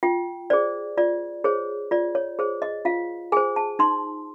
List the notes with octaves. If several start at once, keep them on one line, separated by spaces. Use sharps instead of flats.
F4 G5
G#4 C5 D5
F4 D5
G#4 C5 C#5
F4 D5
C#5
G#4 C5
D#5
F4 F5
G#4 C5 G#5
A5
D#4 C6